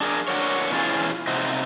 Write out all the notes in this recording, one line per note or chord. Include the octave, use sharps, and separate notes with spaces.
D4 G#4 A#4
D4 F#4 A#4 C#5
B2 E3 C#4 F4 G#4
C3 C4 D#4 F#4